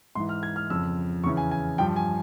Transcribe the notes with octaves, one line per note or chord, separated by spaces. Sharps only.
G#2 E3 C6
F6
G#6
F6
F2 C#3 F3 E6
E2 C#3 E3 C#6
G#5
G#5
G2 F3 G5
G#5